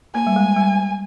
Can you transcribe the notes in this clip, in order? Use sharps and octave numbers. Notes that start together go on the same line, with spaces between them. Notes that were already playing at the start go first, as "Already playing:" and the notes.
A#3 G#5
G3
G#3
G3